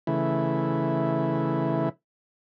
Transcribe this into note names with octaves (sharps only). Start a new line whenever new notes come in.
C#3 E3 A3 E4